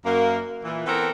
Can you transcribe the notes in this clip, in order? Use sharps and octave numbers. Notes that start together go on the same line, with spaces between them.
F#2 A#3
A#2 E3
E3 B3 C4 A4 A#4